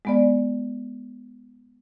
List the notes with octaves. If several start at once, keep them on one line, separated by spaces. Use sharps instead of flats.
G#3 B3 D5